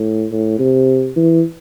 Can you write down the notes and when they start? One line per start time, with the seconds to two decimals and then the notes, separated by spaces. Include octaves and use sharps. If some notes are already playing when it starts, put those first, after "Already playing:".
Already playing: A2
0.31 A2
0.59 C3
1.16 E3